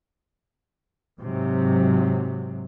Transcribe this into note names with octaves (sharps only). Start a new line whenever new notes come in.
G#2 C3 F#3